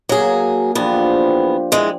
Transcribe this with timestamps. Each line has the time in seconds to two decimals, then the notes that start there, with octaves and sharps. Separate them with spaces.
0.09 F#3 A#3 G#4
0.75 E2 F3 B3 D4 G4
0.97 C5
1.72 E3 G#3